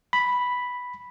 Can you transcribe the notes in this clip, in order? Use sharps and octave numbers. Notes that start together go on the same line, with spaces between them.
B5